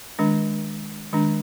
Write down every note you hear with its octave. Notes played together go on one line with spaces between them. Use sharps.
D#3 G#3 D4
D#3 G#3 D4